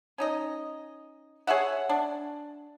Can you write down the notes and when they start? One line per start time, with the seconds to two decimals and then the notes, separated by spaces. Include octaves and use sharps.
0.18 C#4 D#4 D#5
1.47 G#4 C#5 E5 F#5
1.89 D4